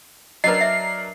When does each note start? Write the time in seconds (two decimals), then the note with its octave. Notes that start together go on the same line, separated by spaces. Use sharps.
0.44 F#3 D4 A#4 B4 D#5 C7
0.61 E5